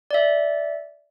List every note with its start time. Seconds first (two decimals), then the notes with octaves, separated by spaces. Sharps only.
0.11 D5 E5